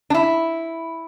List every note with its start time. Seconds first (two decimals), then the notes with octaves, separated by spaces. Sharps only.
0.10 D4
0.14 E4